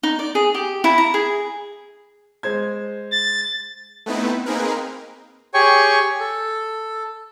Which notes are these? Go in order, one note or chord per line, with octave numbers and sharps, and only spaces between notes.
D#4
D5
G#4
G4
E4
A#5
G#4
G#3 C5 G#6
A6
A3 B3 C4 D#4 E4 B4
A#3 C4 D#4 G#4 A#4 B4
G4 G#4 C#5 G5 G#5 C#6
A4